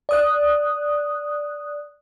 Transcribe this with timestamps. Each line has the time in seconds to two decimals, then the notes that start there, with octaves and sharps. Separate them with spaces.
0.09 D5 D#6 F#6